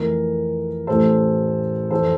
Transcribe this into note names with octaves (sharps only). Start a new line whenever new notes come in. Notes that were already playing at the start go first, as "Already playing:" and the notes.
Already playing: F2 E3 A3 A#4
A1 A2 E3 A4 C5
F2 E3 A4 C5